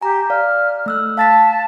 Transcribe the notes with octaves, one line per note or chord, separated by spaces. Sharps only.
G4 G#5 A#5
D5 F5 F6
A3 E6 F#6
F5 A5 A6 B6